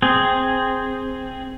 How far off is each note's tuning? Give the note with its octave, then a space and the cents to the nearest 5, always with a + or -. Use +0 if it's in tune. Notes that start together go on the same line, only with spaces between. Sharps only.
C4 +0 G#4 +0